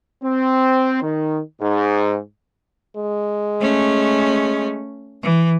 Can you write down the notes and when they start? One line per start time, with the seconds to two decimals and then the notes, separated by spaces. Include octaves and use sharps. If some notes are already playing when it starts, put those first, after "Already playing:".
0.22 C4
1.02 D#3
1.60 G#2
2.97 G#3
3.60 A3 C#4
5.23 E3